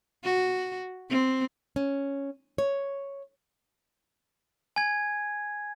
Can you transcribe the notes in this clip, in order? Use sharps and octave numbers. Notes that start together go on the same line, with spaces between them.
F#4
C4
C#4
C#5
G#5 G#6